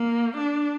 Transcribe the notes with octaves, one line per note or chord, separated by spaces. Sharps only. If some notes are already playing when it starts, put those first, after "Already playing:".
Already playing: A#3
D4